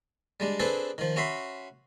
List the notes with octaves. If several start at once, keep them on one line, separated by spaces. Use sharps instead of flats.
G3 G#3 D4
C4 D4 G#4 A4 B4
D#3 F3
C#4 F#4 E5 B5 C6